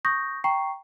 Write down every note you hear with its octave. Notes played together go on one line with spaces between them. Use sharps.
C#6 D#6 G6 A#6
G5 A#5 C#6 C7